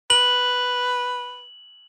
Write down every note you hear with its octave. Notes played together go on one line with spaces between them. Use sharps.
B4 F#7